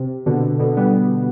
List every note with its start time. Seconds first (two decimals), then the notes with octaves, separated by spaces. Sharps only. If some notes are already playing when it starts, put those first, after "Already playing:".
Already playing: C3
0.26 B2 D3
0.60 B2 D3
0.77 G3 B3